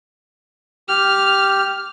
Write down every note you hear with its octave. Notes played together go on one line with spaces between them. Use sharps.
G4 F6